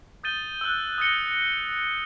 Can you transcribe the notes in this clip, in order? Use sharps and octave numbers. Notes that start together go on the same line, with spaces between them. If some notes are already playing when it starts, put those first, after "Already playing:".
D#6 G6 A6 D#7 G7
E6 F#6
D#6 E6 A6 A#6 C#7 G7